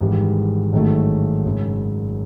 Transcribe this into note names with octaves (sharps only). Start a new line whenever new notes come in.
G#1 G#2 E3 G3
A1 G#2 D#3 F#3 A3
G#1 F#2 C#3